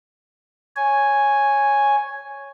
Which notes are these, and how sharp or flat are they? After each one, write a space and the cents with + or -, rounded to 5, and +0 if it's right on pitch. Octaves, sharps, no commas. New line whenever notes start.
C#5 +0 G#5 +0